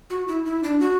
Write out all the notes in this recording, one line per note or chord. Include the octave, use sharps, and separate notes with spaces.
F#4
E4
E4
D4
F#4